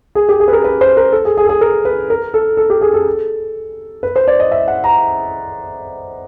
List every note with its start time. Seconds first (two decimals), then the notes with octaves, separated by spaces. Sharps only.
0.15 G#4
0.29 G4
0.40 G#4
0.48 B4
0.53 A#4
0.64 B4
0.81 C5
0.97 A#4
1.12 A4
1.25 G#4
1.37 G#4
1.44 A4
1.49 G#4
1.61 A#4
1.85 B4
2.10 A#4
2.34 A4
2.57 A4
2.70 G4
2.81 G#4
2.94 A4
4.03 B4
4.16 C5
4.28 D5
4.40 D#5
4.52 E5
4.68 F#5
4.84 A#5